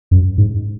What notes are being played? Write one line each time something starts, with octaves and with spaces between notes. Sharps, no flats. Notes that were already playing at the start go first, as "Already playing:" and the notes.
F#2
G#2